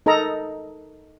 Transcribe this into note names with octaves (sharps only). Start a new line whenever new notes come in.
D#4 A4 A#4 D#5 A#5